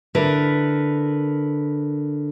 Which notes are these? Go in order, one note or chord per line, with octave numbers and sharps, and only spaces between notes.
D3 E4 A#4 B4